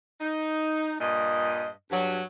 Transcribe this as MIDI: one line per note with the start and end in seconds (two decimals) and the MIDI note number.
0.21 0.95 63
1.00 1.69 43
1.00 1.69 46
1.00 1.69 75
1.91 2.21 43
1.91 2.21 54